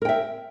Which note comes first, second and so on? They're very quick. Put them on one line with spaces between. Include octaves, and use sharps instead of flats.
A#4 G5 E5